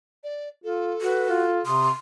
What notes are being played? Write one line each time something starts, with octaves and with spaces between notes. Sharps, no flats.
D5
F4 A4
F#4 B4
F4
C3 C6 D#6